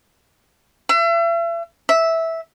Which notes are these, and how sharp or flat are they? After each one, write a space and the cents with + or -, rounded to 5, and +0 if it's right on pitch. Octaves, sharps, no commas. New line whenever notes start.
E5 +40
E5 -10